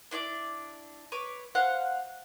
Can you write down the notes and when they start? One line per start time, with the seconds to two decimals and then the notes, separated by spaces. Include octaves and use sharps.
0.11 D4 E4 C#5 D5
1.12 B4 C#5 D6
1.55 C5 F5 F#5 F#6